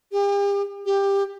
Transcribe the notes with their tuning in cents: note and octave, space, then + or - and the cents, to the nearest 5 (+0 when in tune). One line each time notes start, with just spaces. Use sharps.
G4 +40
G4 +15